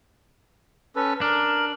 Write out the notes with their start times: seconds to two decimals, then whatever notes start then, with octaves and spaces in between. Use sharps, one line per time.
0.96 C#4 A4 B4
1.21 D4 A#4